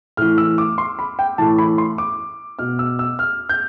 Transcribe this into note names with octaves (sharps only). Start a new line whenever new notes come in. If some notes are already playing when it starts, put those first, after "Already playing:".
A2 E3 F6
E6
D6
C6
B5
G5
A2 E3 A5
B5
C6
D6
B2 F6
E6
E6
F6
G6